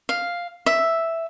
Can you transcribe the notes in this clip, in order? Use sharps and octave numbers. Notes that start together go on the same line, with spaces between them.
F5
E5